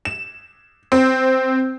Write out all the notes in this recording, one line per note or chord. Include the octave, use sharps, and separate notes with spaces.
E7
C4